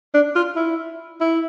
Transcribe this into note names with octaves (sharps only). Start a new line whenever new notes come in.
D4
F4
E4
E4